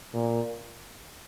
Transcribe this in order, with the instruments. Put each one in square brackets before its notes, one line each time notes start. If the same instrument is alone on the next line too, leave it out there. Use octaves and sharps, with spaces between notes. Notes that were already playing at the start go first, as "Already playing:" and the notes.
[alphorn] A#2